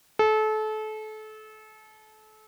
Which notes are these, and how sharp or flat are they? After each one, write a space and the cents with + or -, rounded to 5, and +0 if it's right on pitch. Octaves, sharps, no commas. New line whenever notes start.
A4 -30